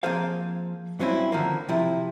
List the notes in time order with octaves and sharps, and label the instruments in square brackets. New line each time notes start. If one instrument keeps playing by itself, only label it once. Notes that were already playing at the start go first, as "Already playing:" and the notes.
[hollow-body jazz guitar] F3 A#3 C4 G#4 C5 F5
G2 F#3 C4 C#4 E4
D3 D#3 F3 A#3
C3 F3 E4